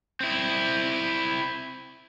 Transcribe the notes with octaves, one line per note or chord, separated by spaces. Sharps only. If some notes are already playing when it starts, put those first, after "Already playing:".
C4 E4